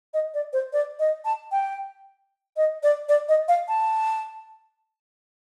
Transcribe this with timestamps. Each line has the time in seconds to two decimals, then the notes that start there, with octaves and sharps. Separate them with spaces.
0.14 D#5
0.34 D5
0.53 C5
0.73 D5
0.99 D#5
1.25 A5
1.52 G5
2.57 D#5
2.83 D5
3.09 D5
3.29 D#5
3.48 F5
3.68 A5